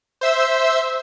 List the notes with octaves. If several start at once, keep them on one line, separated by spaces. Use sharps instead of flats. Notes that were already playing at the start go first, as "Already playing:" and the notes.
C5 E5 E6